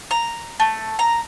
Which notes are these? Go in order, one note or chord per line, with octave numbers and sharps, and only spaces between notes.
A#5
A3
A#5